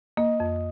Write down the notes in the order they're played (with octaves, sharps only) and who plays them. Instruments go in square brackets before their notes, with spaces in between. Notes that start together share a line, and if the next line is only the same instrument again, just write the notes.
[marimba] A#3 [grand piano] D#5
[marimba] F2